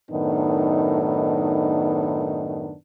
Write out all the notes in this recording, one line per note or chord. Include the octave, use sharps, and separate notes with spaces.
F#2 A2 D#3 B3 D4 D#4